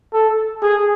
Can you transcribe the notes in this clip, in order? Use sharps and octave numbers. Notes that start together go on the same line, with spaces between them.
A4
G#4